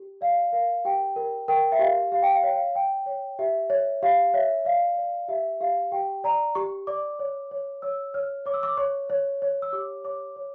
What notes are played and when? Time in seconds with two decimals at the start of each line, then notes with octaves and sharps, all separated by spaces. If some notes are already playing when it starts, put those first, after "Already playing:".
Already playing: G4
0.21 D5 F5
0.52 A#4 F5
0.85 G4 G5
1.16 A#4
1.48 A#4 G5
1.72 E5
1.79 G4 F5
2.12 G4 F5
2.23 G5
2.34 F5
2.43 C#5 G5
2.55 F5
2.75 C#5 G5
3.06 C#5
3.39 G4 E5
3.70 C#5
4.03 G4 F5
4.34 C#5 E5
4.65 D5 F5
4.97 D5
5.29 G4 E5
5.60 G4 F5
5.92 G4 G5
6.24 D5 A#5
6.55 G4 C#6
6.87 D5 D6
7.19 C#5
7.51 C#5
7.82 C#5 E6
8.14 C#5 F6
8.46 C#5 D6
8.54 E6
8.63 D6
8.77 C#5 C#6
9.10 C#5
9.42 C#5
9.62 E6
9.73 G4 D6
10.04 C#5 D6
10.36 C#5